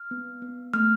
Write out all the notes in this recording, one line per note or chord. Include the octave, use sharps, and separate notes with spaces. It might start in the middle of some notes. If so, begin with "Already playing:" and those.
Already playing: F6
B3
B3
A3 F6